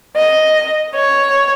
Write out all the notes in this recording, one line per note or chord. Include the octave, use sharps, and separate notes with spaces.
D#5
C#5